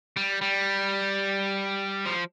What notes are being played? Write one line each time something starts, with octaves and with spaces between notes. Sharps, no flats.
G3
G3
F3